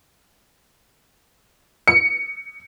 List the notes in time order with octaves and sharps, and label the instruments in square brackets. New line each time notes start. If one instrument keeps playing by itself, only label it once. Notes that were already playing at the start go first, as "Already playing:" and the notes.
[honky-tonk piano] C#7